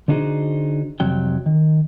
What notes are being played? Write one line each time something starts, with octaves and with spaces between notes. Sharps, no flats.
D3 D4 D#4 F#4 G#4 C5
C2 F2 C3 F#3 G5
D#3